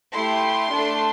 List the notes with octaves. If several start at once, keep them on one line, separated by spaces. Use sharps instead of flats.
A3 E4 G4 C6
A3 D4 A4